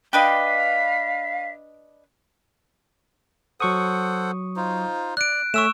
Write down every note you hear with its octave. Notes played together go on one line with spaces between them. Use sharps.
D4 B4 D#5 F5 G5 B6
F#3 A4 C5 F#5 C#6 D#6
D#4 F4 C5
D5 F#6 D7
A3 C#5 E5 G#5 C#6 E6 E7